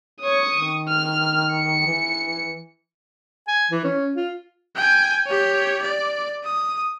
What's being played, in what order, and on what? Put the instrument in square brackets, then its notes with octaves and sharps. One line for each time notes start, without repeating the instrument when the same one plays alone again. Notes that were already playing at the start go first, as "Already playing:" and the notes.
[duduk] C#5 [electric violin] C#6 D#6
[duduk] D#3
[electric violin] F6
C#7
[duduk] E3
[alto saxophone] G#5
E3
C#4
F4
[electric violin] G5 G#5
G4 C#5
D5
D#6